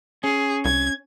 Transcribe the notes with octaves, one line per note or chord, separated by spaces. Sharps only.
C#4 G#4
C2 G#6